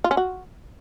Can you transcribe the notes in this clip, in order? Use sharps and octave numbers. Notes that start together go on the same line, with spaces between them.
F4
C#4
F#4